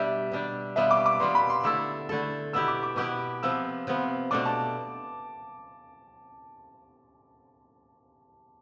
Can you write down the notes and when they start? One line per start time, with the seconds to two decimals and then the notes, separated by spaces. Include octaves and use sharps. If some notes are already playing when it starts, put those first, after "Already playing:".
Already playing: B2 G3 D4 G4 E5
0.32 B2 G3 D4 G4
0.76 B2 G3 B3 F4 E5
0.91 D6
1.06 D6
1.20 B2 G3 B3 F4 C6
1.35 B5
1.49 C6
1.64 D3 A3 E4 A4 E6
2.09 D3 A3 E4 A4
2.53 B2 B3 E4 G4 E6
2.68 D6
2.83 D6
2.96 B2 B3 E4 G4 D6
3.43 C3 F3 B3 F4 E6
3.87 C3 F3 B3 F4
4.31 B2 A3 D4 A4 D6
4.46 A5